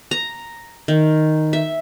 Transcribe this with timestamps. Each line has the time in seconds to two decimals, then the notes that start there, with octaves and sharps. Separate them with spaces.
0.11 A#5
0.88 D#3
1.53 E5